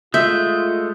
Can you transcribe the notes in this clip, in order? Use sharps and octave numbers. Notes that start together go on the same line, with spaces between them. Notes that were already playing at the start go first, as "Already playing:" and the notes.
G#3 A3 F4 E5 G6